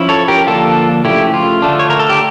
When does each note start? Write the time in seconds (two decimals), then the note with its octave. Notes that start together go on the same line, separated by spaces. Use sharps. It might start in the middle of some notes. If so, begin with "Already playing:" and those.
Already playing: F3 C#4 E4
0.09 A4 C#5
0.28 G4 A#4
0.47 D3 F3 A#3 D4 F4 A4
1.05 C#3 F3 A3 E4 G4
1.34 F4
1.62 D3 A3 D4
1.79 C#5
1.90 A#4
1.99 A4
2.09 G4